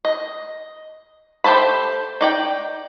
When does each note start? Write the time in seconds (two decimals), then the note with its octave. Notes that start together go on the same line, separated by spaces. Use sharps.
0.05 D#5
1.44 A3 G4 C5 A5 B5
2.21 D#4 D5 G5